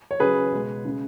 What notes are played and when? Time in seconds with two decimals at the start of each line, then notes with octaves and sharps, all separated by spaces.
0.11 C#5
0.20 C#3 F#3 G#4 B4
0.52 B2 G#3
0.85 C#3 G#3